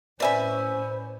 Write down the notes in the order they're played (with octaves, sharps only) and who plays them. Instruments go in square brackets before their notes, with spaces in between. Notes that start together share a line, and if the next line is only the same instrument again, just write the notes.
[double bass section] A2 C#4 [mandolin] B4 E5 B5 [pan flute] C5 [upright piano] D5 G#5